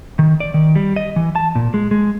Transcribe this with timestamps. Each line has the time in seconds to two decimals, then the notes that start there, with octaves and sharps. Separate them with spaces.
0.19 D#3
0.40 D5
0.54 D#3
0.75 G3
0.96 D#5
1.16 E3
1.35 A5
1.55 A#2
1.74 G#3
1.91 G#3